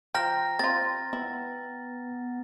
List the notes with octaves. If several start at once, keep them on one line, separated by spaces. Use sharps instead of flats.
F3 G5 A#5 F6 A#6
C4 F4 A6
B3 E4